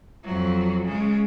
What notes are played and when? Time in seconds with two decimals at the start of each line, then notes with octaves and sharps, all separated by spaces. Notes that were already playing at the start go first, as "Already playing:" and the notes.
0.24 F2 F#3
0.85 C#3 G#3